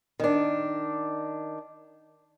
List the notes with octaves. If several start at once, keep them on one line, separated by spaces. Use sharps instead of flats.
D#3 D4